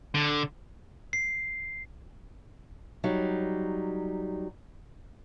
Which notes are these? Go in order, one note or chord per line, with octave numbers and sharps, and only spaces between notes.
D3
C7
F#3 G3 D#4